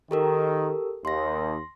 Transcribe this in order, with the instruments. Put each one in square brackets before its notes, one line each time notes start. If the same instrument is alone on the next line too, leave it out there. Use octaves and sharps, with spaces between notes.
[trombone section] D#3 [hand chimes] G4 A4 A#4
[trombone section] D#2 [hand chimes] C6 A#6